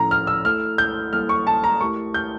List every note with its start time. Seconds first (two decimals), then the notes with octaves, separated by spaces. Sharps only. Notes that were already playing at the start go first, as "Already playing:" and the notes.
Already playing: A2 F3 C#4 E4 A4 A#5
0.11 F6
0.27 E6
0.45 A3 E4 A4 F6
0.78 G6
1.13 G3 A#3 E4 A4 F6
1.29 C#6
1.47 A5
1.64 A#5
1.81 A3 E4 G4 A#4 C#6
2.14 G6